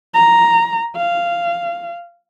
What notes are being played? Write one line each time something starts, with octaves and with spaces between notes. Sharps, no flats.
A#5
F5